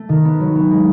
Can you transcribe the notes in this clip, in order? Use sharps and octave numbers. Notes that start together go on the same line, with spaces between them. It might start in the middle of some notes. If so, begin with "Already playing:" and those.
Already playing: A3
D#3
B3
F#3
B3
G#3